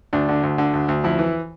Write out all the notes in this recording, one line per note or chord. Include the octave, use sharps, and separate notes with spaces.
D2 D4
D3
D2
D3
D2
D2
F2 E4
E3